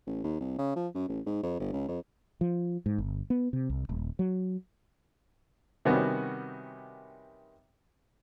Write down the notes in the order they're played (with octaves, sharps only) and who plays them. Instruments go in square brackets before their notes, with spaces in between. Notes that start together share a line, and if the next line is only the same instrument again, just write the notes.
[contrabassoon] A1
D#2
C2
C#3
F3
F#2
A1
G#2
F2
G1
C#2
F2
[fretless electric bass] F3
G#2
G1
B3
C3
C2
D#1
F#3
[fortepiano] C3 D#3 G3 B3 C#4 F#4